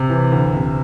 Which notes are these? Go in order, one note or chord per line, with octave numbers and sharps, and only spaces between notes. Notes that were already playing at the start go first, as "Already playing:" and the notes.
Already playing: C3
E3
D2
C3